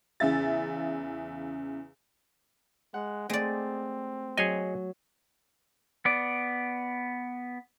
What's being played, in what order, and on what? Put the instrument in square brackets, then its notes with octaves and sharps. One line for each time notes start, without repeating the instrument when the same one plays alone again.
[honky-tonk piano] E2 C#3 E5 A6
[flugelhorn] G#3 [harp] F#5
[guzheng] G#3 D5 [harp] A3 [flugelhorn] C4
[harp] F#3 [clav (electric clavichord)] G#4 C#5 D#5 [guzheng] G#5
[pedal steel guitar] B3 D5